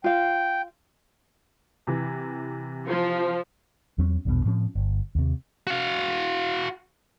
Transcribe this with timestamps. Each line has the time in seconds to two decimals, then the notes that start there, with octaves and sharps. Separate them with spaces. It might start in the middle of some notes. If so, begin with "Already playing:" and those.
0.04 F4 F5 G5
1.87 C3 E3
2.87 F3
3.98 E2 F#3 C4 C#4
4.25 A#1 E2 G2 B2
4.45 A2 F3 C4 C#4
4.75 G1
5.15 D#2 C3
5.67 F#4 F5